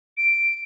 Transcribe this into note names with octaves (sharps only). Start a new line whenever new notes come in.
D7